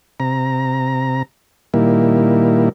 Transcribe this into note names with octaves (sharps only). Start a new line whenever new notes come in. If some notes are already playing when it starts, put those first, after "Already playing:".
C3 A#5
A#2 D#3 G3 A#3 E4